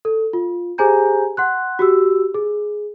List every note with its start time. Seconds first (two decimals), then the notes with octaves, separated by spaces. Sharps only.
0.05 A4
0.33 F4
0.78 G4 G#4 C5 G#5 A#5 G6
1.37 F#5 C6 F#6
1.79 F#4 G4 E6
2.35 G#4